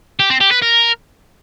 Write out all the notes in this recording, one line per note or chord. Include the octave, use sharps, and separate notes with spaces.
G4
C4
G4
B4
A#4